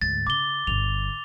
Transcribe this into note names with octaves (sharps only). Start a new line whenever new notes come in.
D2 G#2 A6
C#3 D6 G7
G1 D3 F7